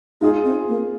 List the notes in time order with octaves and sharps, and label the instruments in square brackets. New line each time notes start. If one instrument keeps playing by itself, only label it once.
[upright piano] G#3 F4 G#4 [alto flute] D#4
[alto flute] C4
A#3